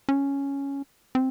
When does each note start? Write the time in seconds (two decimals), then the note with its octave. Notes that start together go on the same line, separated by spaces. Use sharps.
0.09 C#4
1.15 C4